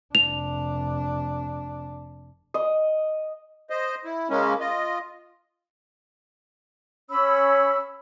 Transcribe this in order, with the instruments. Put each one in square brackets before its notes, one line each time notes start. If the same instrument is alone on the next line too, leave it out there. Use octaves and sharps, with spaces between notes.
[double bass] F1 D4 [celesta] F7
[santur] D#5
[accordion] C5 D#5
E4
C#3 G#3 A#3 C#4
F4 D#5
[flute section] C#4 C#5 B5 E6